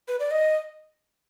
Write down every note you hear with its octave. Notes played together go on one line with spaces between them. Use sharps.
B4
D5
D#5